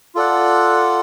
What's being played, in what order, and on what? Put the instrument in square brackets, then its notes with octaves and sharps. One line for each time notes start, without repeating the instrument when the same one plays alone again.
[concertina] F4 A4 D5 F#5